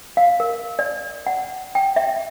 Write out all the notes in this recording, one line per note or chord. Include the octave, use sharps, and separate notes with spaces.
F5
A#4
D5
F#5
G5
E5